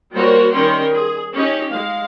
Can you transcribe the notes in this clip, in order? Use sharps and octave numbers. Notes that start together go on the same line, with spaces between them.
G3 A#3 F#4 A#4 C5 C#5
D#3 G3 C#4 A#4 G5 C6
G#4
C#4 D#4 G4
G#3 F5